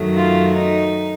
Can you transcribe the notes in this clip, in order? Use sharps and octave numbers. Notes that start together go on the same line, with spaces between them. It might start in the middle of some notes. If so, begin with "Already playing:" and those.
Already playing: F#2 D#3 F#3 A3
F4
D#4